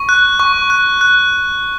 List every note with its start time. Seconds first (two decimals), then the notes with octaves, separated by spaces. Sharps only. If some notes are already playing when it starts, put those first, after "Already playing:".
Already playing: C#6
0.09 F#6
0.40 C#6
0.70 F#6
1.01 F#6